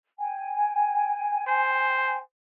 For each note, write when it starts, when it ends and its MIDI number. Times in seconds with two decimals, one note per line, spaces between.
0.18 2.19 79
0.18 2.19 80
1.48 2.20 72